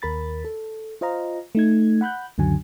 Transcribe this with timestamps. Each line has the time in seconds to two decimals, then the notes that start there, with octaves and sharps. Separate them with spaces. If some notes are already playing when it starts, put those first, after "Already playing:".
0.02 D#2 A#4 B5 A6
0.45 A4
1.01 F4 C5 D#5 F5 A#5
1.55 A3 D#4 G#6
2.01 F#5 B5 F#6 G6
2.38 C#2 F#2 D3 F#3 G#5